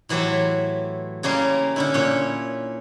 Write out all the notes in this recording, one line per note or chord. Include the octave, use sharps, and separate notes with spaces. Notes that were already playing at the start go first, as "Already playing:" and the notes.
A2 E3 F#3 G4 C5 E5
C#3 G3 A#3 C#4 A#4 C6
D3 C#4 E4
A#2 C#4 C#5